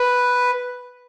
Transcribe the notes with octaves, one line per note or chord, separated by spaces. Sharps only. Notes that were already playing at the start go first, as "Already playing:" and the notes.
Already playing: B4